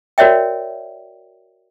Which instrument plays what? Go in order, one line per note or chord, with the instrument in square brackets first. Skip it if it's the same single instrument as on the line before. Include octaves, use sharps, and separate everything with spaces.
[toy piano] F#4 A#4 C#5 D5 E5 G5